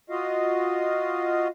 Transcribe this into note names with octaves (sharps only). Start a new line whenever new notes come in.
F4 F#4 D#5 F5